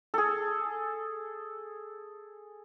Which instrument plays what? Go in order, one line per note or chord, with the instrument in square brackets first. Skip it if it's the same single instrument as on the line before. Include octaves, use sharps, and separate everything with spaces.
[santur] G#4 A4